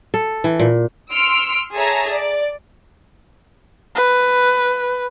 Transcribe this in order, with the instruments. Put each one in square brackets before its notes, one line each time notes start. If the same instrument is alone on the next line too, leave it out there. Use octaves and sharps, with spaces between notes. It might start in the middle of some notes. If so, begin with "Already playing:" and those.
[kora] A4
E3
A#2
[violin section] C6 E6 F6 C#7 D7
G#4 A4 C#5 E5 A5 A#5
D5
[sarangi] B4